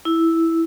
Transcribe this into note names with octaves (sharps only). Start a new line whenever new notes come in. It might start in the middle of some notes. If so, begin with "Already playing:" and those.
E4